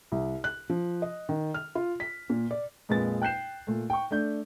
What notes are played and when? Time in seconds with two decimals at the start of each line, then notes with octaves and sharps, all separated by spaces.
0.12 C2
0.44 F#6
0.70 F3
1.02 D#5
1.29 D#3
1.54 F6
1.75 F4
2.00 B6
2.30 A#2
2.51 D5
2.89 F2 A#2 G#3 B4 A6
3.22 G5 F#6 G6 C7 E7
3.67 A#2 A3
3.90 G5 C#6
4.11 A3 D4 G6